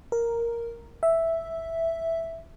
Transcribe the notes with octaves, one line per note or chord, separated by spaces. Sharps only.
A#4
E5